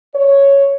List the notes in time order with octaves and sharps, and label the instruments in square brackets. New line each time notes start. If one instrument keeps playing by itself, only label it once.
[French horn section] C#5